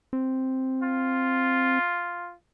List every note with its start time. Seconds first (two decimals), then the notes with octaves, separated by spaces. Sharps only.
0.13 C4
0.83 F4